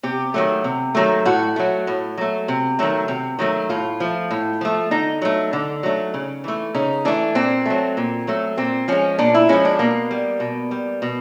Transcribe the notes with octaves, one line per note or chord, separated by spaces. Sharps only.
C3 G4
D#3 F#3 A3
C3
D#3 F#3 A3
A2 F#4
F#3 A3
A2
F#3 A3
C3
D#3 F#3 A3
C3
D#3 F#3 A3
A2 F4
F3 A3
A2
F3 A3
D3 D#4
F#3 A3
D3
F#3 A3
C#3
E3 A3
C#3 D#4
E3 A3 D4
A#2 C4
F#3 A3
A#2
F#3 A3
A#2 C4
F3 G#3 C#4
A#2 D4
E4
F3 G#3 C#4
D4
B2 A#3
G3
B2
G3
B2